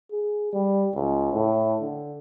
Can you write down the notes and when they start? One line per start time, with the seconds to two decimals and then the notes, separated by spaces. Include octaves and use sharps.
0.12 G#4
0.53 G3
0.95 C#2
1.33 A2
1.81 D3